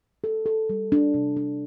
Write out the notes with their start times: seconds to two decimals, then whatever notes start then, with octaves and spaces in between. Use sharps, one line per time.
0.24 A4
0.46 A4
0.69 G3
0.92 D4
1.14 C3
1.37 D4